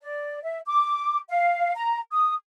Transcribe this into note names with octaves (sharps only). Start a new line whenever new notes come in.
D5
E5
D6
F5
A#5
D#6